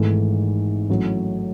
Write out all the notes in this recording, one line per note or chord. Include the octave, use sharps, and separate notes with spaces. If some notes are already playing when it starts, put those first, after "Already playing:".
Already playing: G#1 G#2 E3 A3
A1 A2 F#3